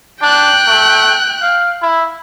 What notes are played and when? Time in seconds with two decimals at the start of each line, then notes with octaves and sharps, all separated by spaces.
0.22 D4 G5 F#6
0.67 A3
1.42 F5
1.82 E4